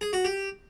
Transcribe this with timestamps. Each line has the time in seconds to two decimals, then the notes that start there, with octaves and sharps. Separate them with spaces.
0.01 G#4
0.13 F#4
0.25 G4